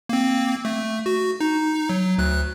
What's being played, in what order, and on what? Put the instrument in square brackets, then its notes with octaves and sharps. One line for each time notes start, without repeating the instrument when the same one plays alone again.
[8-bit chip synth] A#3 C4
A3
F#4
D#4
F#3
D2 F#6